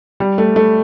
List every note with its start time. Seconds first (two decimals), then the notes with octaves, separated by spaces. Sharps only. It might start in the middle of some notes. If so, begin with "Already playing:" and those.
0.20 G3
0.38 A3
0.56 A3